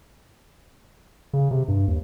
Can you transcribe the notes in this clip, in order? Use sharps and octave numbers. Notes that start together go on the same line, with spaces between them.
C#3
C3
G2
D#2